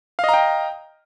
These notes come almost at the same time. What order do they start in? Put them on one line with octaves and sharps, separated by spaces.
F5 D#5 A#5 G5